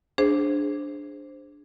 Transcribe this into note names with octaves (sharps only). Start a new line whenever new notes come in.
D4 G#4 C5